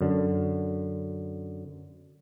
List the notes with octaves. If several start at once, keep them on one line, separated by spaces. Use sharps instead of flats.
F#2 D3